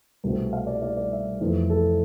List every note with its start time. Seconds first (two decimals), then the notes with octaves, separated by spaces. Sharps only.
0.24 C2 B2 A3 C4
0.53 F5
0.67 D5
0.82 D5
0.97 D5
1.12 E5
1.40 F2 E3 A3
1.70 A4